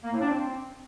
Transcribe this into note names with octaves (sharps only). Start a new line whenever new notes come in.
A#3
A2
D4
C4